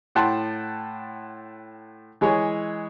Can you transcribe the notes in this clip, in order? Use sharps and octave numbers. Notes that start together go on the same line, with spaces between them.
A2 F#5 G5 A5 C6
E3 G#3 G#4 C#5